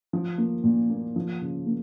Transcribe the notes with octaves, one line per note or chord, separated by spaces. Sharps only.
F3
A#3
A#2
A#3
F3
C#3
A#3